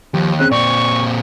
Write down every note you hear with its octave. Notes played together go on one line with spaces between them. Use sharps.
D#2 F3 G4
C4 C#4 G#4 F#6
A#2 C4 D5 C#6